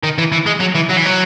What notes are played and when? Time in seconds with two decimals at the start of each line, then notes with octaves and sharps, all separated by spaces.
0.03 D#3
0.18 E3
0.32 E3
0.46 G#3
0.60 F#3
0.75 E3
0.90 F#3
0.97 E3
1.06 F#3